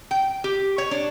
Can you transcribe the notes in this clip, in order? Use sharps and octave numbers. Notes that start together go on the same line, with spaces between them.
G5
G4
C#5
D4